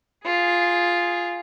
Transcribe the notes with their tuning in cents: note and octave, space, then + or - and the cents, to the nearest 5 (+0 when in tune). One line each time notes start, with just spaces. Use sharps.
F4 +0 G#4 +0